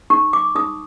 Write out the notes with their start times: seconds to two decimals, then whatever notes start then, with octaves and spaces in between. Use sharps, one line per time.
0.10 D#4 C#6
0.33 D6
0.55 D#4 D#6